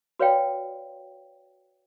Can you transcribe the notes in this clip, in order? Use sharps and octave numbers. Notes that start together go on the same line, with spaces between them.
F#4 B4 C#5 D5 F5 G5